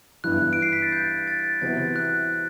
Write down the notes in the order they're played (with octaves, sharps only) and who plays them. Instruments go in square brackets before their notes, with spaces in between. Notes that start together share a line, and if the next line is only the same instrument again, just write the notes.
[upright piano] G2 E3 B3 E4 [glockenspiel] F#6
[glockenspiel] D7
C7
B6
A6
G6
A6
[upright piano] C3 E3 B3 F#4 C5 [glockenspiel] A6
[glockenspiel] F#6